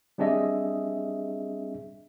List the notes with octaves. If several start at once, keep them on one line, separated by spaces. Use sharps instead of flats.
G3 C4 D4 G#4 D#5 E5